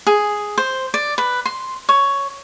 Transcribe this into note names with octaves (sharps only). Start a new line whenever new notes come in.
G#4
C5
D5
B4
C6
C#5